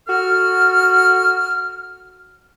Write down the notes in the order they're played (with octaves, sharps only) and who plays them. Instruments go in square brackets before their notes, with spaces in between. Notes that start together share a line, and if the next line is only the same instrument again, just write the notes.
[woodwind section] F#4 A4 F6